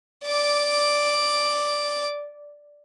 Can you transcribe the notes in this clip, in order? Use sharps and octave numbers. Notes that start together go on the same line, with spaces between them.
D5 D6